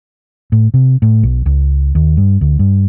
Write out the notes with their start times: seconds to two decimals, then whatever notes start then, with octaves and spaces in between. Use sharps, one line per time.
0.52 A2
0.74 C3
1.02 A2
1.23 B1
1.46 C#2
1.95 D#2
2.17 G2
2.41 D2
2.59 G2